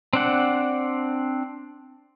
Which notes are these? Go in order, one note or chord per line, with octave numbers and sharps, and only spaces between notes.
C4 D4 F#5